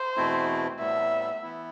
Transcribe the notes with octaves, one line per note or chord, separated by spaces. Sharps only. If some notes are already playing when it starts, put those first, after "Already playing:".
Already playing: C5
E2 B2 A3 C4 E4
A2 G3 B3 E5
E3 B3 E4